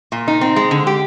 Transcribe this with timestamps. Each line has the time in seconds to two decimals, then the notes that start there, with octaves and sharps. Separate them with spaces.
0.12 A#2
0.28 D#4
0.41 C4
0.56 G#3
0.71 D3
0.87 G4